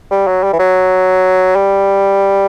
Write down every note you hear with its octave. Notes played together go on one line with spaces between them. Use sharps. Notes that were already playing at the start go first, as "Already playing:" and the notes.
G3
F#3
G3
E3
F#3
G3